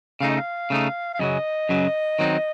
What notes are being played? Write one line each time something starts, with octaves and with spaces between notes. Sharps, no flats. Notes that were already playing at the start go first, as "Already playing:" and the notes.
C#3 A3 D#4 F5
D#5
F5
C#3 A3 D#4
F5
F#2 C#3 F#3 D#5
F#2 C#3 F#3
D#3 F#3 C4 D#4